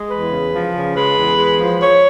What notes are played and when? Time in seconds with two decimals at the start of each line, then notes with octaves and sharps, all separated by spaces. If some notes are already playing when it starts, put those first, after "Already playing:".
Already playing: G#3
0.10 E2 B4
0.31 C#3
0.52 F3
0.74 C#3
0.95 G#3 B4
1.16 E2
1.37 G#3
1.59 F3
1.80 F3 C#5